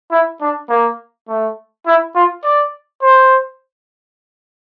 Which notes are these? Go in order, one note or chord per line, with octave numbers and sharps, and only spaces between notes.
E4
D4
A#3
A3
E4
F4
D5
C5